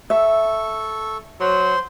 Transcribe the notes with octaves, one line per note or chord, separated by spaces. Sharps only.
A4 E5 C#6
F#3 C5 C6